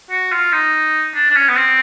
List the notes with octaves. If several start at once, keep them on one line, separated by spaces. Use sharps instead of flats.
F#4
F4
D#4
D4
D4
C#4
B3
C4